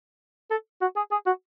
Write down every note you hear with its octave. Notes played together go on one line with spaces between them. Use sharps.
A4
F#4
G#4
G#4
F#4